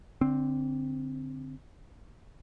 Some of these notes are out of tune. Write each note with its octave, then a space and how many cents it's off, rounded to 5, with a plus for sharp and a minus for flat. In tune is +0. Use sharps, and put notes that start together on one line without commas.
D3 -15 C4 +0